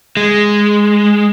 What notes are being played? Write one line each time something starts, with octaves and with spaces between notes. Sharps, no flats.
G#3